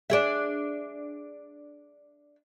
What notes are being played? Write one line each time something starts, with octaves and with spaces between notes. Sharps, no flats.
D4 G#4 E5